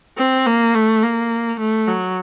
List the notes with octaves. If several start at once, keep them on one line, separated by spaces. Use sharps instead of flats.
C4
A#3
A3
A#3
A3
F#3